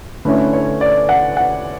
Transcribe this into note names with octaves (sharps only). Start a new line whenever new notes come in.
D3 A3 C#4 E4 B4
C#5
D5
F#5
F#5